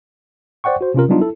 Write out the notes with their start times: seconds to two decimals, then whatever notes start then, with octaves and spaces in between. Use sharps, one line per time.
0.64 C5 D5 F#5 G5 C#6
0.81 F#4 C5
0.94 C3 C#4 F4 A#4
1.09 F#3 G3 B3 D4 D#4 F4
1.20 E4 A4